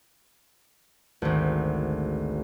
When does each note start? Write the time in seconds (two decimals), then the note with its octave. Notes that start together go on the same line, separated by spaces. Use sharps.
1.22 G#1 D2